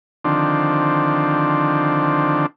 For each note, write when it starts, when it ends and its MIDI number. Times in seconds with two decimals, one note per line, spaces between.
0.25 2.46 50
0.25 2.46 51
0.25 2.46 53
0.25 2.46 60
0.25 2.46 62